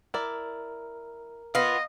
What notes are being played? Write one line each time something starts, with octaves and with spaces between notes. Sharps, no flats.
E4 A#4 D5
B3 F4 D#5 F5